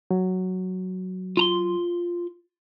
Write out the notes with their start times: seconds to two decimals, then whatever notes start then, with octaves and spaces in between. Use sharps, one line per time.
0.11 F#3
1.37 F4 A#5 C6